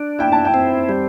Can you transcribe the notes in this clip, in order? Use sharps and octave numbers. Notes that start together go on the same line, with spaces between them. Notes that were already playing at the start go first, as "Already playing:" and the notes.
Already playing: D4
E4 G5
A5
G5
C4
G3